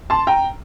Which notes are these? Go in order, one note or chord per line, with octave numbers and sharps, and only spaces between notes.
A5 C6
G5 A#5